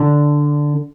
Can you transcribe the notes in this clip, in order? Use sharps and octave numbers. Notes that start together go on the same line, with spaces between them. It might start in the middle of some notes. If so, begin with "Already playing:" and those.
Already playing: D3 D4